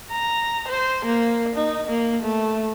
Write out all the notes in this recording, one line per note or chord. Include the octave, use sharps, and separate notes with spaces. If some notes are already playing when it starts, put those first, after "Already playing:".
A#5
C5
A#3
D#4
A#3
A3